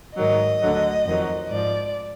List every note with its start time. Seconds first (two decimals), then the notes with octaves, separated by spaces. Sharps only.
0.17 G#2 D#3 F#3 D#5
0.62 D2 D3 F#3
1.06 F2 D#3 F#3
1.51 G#2 F3 D5